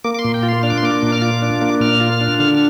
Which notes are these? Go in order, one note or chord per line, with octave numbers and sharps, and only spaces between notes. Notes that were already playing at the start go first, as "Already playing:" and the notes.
A#3 D6
D6
C6
A#2
G5
F4
C6
D4 F6
D6
C6
A#3 D6
A#2
F6
F4 D6
D4
A#3
A#2 F6
F4
D4
D3 F6
F6